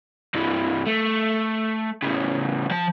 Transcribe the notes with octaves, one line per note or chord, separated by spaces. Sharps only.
G2 E3
A3
A2 C#3
F3 A5